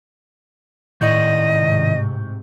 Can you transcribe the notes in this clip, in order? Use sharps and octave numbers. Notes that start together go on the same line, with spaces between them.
A2 D#3 E4 D5 D#5 C#6 G6
G#2 C3